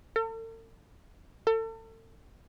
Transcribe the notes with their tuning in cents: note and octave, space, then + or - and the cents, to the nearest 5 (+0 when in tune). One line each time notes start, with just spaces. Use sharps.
A4 +45
A4 +35